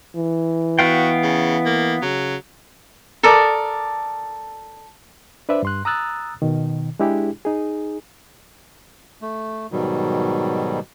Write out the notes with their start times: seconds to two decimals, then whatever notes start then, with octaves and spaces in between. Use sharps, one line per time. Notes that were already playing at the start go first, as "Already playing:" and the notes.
0.16 E3
0.79 B3 F#4 F5 G5
1.23 C#3
1.66 A#3
2.02 C#3 F#3
3.23 A4 A#4 D5 D#6
5.49 D4 B4 C5 D5 E5
5.63 G2 C6 F#6
5.85 A#5 D#6 E6 F#6 A6
6.42 B2 D#3
7.00 G#3 D4 E4 G4 G#4
7.45 D#4 G#4
9.22 A3
9.72 G#2 B2 D#3 F#3 G3